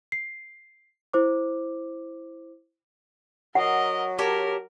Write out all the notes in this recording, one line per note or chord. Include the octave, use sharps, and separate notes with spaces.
C7
E4 C5 D6
F#3 A#4 D#5 F#5
G4 A#4 C#5 A5